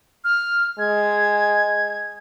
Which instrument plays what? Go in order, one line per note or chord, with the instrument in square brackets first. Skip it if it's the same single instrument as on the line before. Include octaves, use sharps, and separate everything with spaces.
[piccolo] F6
[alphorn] G#3 [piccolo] G#6